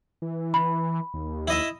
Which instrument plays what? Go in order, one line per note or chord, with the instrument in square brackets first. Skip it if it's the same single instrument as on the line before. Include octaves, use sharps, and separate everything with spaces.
[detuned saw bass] E3
[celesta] B5
[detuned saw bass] D#2
[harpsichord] E4 D#5 E5